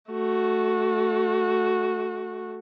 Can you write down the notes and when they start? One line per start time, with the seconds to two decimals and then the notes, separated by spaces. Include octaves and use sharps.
0.10 A3 F#4